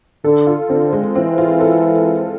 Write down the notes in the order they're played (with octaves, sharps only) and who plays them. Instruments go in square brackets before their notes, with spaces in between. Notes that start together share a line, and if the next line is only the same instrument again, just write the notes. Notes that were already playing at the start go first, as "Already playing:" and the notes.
[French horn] D3 [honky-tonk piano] A4
[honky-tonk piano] F4
[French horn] D3 [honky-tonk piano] C4
[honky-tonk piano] G#3
[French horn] E3 [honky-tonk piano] C4
[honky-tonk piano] F4
A4